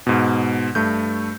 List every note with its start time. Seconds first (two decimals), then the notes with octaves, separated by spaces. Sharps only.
0.07 G#2 B2
0.75 G2 A3 G6